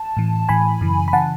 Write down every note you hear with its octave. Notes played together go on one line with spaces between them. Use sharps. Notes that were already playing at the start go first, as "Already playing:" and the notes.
Already playing: A5
A2 E3
A2 E3 G#5 B5
F#2 C#3 E3
B5
C#3 E3 F#5 A5